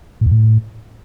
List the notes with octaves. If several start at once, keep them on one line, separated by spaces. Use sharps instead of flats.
A2
E2
A2